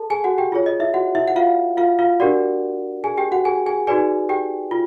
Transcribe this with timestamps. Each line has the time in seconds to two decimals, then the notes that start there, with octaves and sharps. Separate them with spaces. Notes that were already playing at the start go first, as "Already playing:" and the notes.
Already playing: G#4 A4 A5
0.10 G#4 G#5
0.24 F#4 F#5
0.38 G4 G5
0.52 F4 G#4 C#5
0.66 D#5
0.80 E4 E5
0.94 F#4 F#5
1.15 E4 E5
1.28 F#5
1.36 F4 F5
1.77 F4 F5
1.99 F4 F5
2.20 D4 F#4 G4 A#4 D5 F#5
3.04 G#4 G#5
3.18 G4 G5
3.32 F#4 F#5
3.45 G#4 G#5
3.66 G#4 G#5
3.87 D#4 F#4 G#4 B4 D5 G#5
4.29 G4 G5
4.71 F4